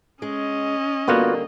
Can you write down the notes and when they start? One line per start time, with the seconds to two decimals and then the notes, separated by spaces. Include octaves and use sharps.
0.22 G#3 C#4 D#5
1.08 D3 G3 A#3 B3 F4 F#4